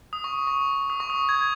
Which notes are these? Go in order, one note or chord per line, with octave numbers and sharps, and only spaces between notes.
D#6
C#6
C#6
D#6
C#6
D#6
G#6